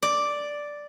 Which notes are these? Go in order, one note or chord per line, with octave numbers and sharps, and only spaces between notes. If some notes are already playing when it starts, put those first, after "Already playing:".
D5